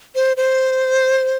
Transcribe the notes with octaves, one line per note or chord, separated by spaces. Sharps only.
C5
C5